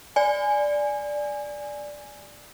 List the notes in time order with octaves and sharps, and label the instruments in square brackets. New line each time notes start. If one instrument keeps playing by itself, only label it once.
[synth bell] D5 G#5